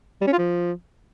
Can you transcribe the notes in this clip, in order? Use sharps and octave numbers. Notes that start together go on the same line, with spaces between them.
G3
C#4
F4
F3